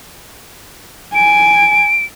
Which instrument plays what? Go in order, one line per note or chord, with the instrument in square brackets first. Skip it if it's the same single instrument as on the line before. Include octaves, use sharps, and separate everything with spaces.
[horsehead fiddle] G#5 [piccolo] D7